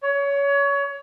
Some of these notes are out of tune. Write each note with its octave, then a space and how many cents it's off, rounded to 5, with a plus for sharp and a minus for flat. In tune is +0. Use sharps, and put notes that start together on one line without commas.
C#5 +25